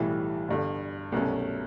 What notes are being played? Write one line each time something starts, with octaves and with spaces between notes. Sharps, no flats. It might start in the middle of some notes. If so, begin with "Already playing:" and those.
Already playing: B1 A2 E3 G3
G1 G2 D3
C2 B2 F#3 A3 C#4